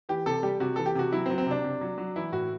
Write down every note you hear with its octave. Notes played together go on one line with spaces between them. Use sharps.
E3 G4
C3 A4
G3 G4
C3 F#4
E3 A4
G4
C3 F#4
F#3 E4
C4
F#3
C4
C3 D4
C3
F#3
F#3
E3 E4
A2 F#4